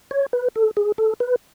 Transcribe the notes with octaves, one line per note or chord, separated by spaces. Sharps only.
C#5
B4
A4
G#4
A4
B4